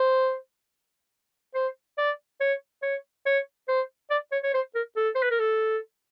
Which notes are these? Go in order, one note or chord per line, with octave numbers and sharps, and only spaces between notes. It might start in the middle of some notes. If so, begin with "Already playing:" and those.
Already playing: C5
C5
D5
C#5
C#5
C#5
C5
D5
C#5
C#5
C5
A#4
A4
C5
B4
A#4
A4